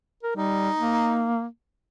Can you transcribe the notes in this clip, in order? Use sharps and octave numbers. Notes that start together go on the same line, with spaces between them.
A#4
G3 D#4
A#3